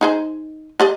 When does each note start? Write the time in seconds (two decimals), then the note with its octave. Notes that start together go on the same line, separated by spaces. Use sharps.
0.01 D#4 G#4 C5
0.80 G4 D5 D#5